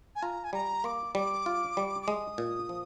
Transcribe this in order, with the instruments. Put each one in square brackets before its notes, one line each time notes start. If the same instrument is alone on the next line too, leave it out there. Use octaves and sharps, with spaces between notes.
[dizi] G#5
[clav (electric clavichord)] F4 [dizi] A#5
[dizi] G#5
[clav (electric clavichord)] G3 [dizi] A#5
[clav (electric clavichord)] A#3 [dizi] D6
[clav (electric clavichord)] G3 [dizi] D6
[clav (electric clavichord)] F4
G3
[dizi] D6
[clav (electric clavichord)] G#3 [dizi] D#6
[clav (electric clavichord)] A#2
F3